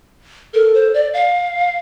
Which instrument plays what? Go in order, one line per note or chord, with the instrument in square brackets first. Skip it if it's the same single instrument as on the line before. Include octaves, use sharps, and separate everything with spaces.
[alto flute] A4 [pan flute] A#4
[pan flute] C5
D5
F5